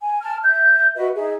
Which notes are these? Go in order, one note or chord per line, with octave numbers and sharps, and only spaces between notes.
G#5
A5 F6
E5 G6
F#4 B4 D#5 E5
D#4 G#4 E5